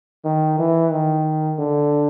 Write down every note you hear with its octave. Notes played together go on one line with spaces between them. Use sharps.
D#3
E3
D#3
D3